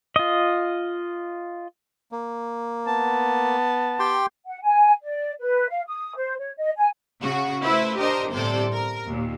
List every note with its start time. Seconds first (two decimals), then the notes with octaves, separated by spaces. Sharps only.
0.16 F4 D#5
2.12 A#3
2.87 B3 A5
3.99 G4 G5 C6
4.46 F#5
4.62 G#5
5.02 D5
5.40 B4
5.69 F5
5.87 D#6
6.15 C5
6.39 C#5
6.57 D#5
6.77 G#5
7.22 C#3 F#4
7.63 A3 E4 B4 C5 E5
7.98 D4 G4 A#4 C5 D#5 A#5
8.32 G1 A2 C3 A4 C5 D5
8.73 A#4
9.06 D#2 A#2